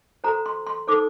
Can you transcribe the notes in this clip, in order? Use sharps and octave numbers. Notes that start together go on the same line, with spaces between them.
F#4 A4 C5 A#5
C6
C6
D#4 A4 C5 D6